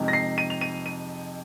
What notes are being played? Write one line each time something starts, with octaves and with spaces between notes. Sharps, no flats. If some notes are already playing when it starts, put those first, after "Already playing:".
Already playing: F2 C3 G#3 D#4
A#6
C7
D#7
F7
D#7
D#7